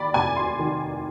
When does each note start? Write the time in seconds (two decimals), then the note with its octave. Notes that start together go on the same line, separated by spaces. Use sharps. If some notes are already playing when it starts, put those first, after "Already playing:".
Already playing: D#2 D5 B5
0.14 F1 G#5
0.37 C6
0.59 D#3